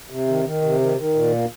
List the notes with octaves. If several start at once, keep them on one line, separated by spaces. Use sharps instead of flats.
C3
D#3
D#3
C3
D#3
D#3
A#2
A#3